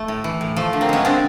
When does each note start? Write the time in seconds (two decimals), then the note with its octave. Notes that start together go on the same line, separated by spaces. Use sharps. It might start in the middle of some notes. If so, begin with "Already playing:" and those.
Already playing: A3
0.08 A2
0.24 E3
0.41 A2
0.56 F3 A3
0.73 D3
0.81 A#3 C4
0.89 G#3 B3 C#4
1.05 D3 C4 D4